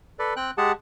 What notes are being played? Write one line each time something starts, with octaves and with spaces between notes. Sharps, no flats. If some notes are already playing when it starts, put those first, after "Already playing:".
A4 B4 D5
C4 G5 F#6
G#3 G4 G#4 F#5 A5